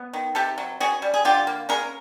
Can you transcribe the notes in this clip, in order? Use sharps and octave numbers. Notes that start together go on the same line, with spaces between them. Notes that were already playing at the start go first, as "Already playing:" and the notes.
Already playing: B3
D#3
C3 G4 A4
F#3
C#4 F#4 G#4
G3
G#4
D3 F4 G4
A#3
C#4 G#4 A#4